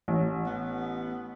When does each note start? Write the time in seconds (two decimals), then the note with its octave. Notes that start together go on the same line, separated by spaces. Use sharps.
0.08 A1
0.47 B3